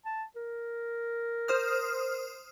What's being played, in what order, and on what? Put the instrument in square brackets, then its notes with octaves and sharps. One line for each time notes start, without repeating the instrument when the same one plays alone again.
[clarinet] A5
A#4
[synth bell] C5 D#6 F6